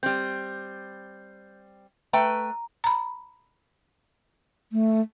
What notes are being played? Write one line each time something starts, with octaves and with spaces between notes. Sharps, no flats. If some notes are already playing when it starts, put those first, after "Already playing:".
G3 C4 G6
A3 B4 G5 A#5
A#5 B5
A3